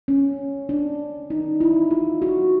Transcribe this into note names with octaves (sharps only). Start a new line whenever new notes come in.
C#4
D4
D#4
E4
F4
F#4